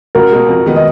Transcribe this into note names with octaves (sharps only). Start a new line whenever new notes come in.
C#2 F#4 A#4
B2 G#3
F2
D#3 G#3 B3 D#4
D#5